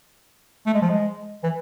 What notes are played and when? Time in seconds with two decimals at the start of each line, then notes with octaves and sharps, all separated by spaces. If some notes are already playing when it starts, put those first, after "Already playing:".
0.66 A3
0.74 G#3
0.82 F3
0.90 G#3
1.44 E3